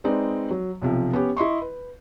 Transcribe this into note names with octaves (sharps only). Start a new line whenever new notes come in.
G#3 C4 D#4 B4 D5
F#3
B1 C3 F3
B3 C#4 G4
E4 D#5 C6 C#6
B4